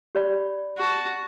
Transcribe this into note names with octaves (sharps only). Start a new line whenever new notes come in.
G4 D5 B5
F#4 A5